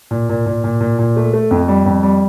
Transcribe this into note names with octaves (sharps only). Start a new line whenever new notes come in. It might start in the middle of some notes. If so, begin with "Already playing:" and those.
A#2
A#2
A#2
A#2
A#2
A#2
A3
A3
F2
G3
F2
G3